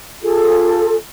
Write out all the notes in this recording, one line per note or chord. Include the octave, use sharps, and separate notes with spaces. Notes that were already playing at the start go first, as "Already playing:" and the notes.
F4 G#4 A4